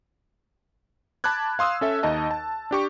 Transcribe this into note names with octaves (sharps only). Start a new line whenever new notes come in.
A5 B5 D6 F#6 G#6
F5 C6 D#6 E6
C#4 A4 E5
D#2 D#4 D#5 A5
A5
D4 G4 C#6